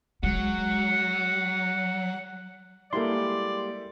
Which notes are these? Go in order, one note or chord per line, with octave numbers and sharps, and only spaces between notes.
F#3 G#3 F#5
G3 G#3 A#3 E4 G4 A4 D5 C6